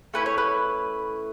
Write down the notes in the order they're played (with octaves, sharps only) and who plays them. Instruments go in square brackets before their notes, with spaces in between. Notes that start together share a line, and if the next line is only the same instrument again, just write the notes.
[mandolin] A3 C#4 E4 B4
C#5
B4